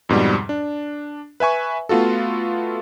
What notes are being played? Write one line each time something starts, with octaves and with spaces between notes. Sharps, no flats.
F2 G#2 B2 G3
D4
B4 E5 G#5 C#6
A3 B3 F4 F#4 A4